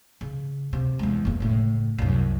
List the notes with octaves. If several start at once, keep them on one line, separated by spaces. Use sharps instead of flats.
C#3
C3
E2 G#3
F#1 E2
A2 C#3
C2 F#2